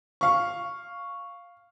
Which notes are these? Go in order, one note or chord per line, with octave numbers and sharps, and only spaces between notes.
F5 C#6